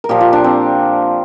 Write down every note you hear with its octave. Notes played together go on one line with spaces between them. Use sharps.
A#4
A#2 F3 G4
F4
D4
C4